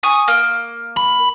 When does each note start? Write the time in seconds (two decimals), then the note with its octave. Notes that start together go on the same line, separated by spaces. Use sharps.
0.03 G#5 C#6 D#6
0.28 A#3
0.97 B5